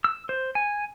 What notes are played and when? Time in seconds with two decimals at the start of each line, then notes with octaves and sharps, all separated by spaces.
0.04 E6
0.29 C5
0.55 G#5